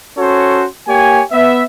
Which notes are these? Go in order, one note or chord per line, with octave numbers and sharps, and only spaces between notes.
C#4 F#4 A4 C5 C#5
A#3 G4 C#5 G#5
B3 E5